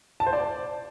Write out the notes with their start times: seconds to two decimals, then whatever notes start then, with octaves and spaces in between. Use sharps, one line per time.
0.20 A5
0.27 C5
0.33 D5